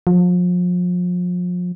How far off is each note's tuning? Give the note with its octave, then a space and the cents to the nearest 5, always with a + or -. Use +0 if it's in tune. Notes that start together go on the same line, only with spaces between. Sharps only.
F3 +35